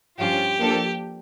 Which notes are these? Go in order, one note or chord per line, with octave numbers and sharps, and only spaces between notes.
G2 F3 C#4 F4 G4
F3 A#3 D4 A4